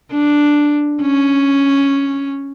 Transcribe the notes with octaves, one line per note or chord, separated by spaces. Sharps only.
D4
C#4